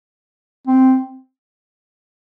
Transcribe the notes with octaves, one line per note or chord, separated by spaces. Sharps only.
C4